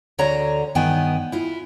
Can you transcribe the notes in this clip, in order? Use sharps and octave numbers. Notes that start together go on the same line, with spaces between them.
D2 D3 C#5 D5 A#5
G2 D#3 B3 G5 G#5
E4 F4